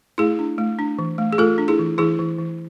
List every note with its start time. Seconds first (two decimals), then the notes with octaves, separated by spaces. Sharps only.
0.18 A3 E4 G#4
0.39 D4
0.58 A3
0.79 D4
0.99 E3
1.18 A3
1.33 G#4
1.38 A3 F4 A4
1.58 D4
1.68 E4 G#4
1.79 E3
1.98 E3 E4 G#4
2.19 E3
2.39 E3